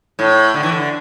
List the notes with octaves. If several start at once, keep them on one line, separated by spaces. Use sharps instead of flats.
A2
D3
E3
D3